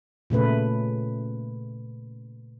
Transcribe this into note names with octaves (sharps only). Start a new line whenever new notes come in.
A#2 C#3 A3 B4